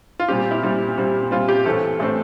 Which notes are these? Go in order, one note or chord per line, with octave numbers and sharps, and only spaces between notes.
F4
A#2 G3 C4 G4
E4
A#2 G3 C4
A#2 G3 C4
A#2 G3 C4 F4
G4
A2 E3 A3 C4 A4
A2 E3 A3 C4 A4